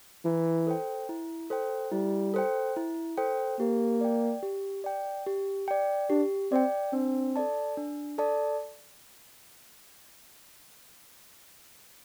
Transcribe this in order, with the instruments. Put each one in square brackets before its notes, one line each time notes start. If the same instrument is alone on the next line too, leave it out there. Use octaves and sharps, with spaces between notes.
[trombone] E3 [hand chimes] E4
[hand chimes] A4 C5 G5
E4
A4 C5 G5
[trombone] G3 [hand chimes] E4
[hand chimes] A4 C5 G5
E4
A4 C5 G5
[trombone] A#3 [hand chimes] G4
[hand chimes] D5 G5
G4
D5 G5
G4
D5 G5
[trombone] D4 [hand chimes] G4
[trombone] C4 [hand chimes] D5 G5
[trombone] C4 [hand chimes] D4
[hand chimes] A4 D5 A5
D4
A4 D5 A5